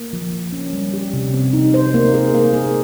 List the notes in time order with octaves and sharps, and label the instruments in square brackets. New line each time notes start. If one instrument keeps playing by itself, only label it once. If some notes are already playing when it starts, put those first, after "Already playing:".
Already playing: [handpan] A#3
F3
F3
C#4
G3
G4
C3
C4
D#4
C5
A#3
G#4
A#3
G#4